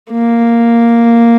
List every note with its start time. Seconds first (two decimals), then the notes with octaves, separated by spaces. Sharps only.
0.12 A#3